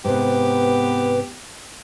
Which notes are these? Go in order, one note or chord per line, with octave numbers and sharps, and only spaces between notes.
G#2 C3 B3 G4 B4